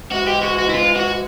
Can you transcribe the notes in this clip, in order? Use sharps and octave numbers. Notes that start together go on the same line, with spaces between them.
G#2 E3 G#3 F#4
G4
F#4
F#4
E4
F4
F#4